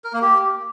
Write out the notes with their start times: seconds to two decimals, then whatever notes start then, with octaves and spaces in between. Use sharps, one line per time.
0.04 A#4
0.13 A#3
0.22 G4